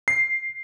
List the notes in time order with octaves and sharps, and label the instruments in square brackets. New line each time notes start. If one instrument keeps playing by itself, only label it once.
[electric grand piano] C7